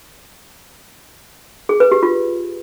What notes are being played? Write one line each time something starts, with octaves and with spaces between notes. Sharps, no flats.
G#4
B4
G4
F4